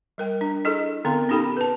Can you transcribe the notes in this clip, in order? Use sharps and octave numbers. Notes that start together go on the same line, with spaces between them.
G3 A#4 G5
D4
E4 G#4 A4 D#5
D3 B3 C4 A#4 F5 C6
C#4 D#4 G4 A4 G5 B5
B4 A5